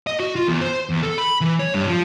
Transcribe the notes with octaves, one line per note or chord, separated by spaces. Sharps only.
D#5
F#4
F4
E2
C5
E2
A4
B5
E3
C#5
G2
F3